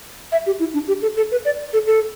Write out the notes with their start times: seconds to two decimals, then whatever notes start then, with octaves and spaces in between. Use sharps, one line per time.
0.32 E5
0.46 G4
0.60 E4
0.74 D4
0.88 G4
1.02 A4
1.17 A4
1.31 B4
1.45 D5
1.73 A4
1.87 A4